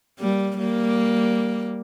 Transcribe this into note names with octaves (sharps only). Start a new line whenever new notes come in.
G3 A#3
G3 A#3